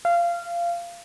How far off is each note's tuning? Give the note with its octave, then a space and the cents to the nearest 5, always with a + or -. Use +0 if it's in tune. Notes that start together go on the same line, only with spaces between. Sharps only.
F5 -20